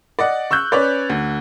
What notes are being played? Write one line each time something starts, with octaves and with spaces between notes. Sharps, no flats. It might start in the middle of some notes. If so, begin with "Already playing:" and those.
D5 D#5 F#5
C#6 E6 F#6 G6
C#4 B4 C#5 D5
D2